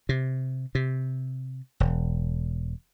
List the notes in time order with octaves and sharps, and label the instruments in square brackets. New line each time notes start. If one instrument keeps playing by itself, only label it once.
[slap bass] C3
C3
E1